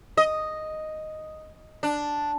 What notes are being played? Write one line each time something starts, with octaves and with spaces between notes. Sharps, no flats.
D#5
D4